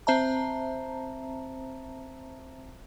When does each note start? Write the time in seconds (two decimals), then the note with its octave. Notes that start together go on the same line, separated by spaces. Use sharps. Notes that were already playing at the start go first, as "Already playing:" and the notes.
0.07 C4 C5 E5 A5 A#5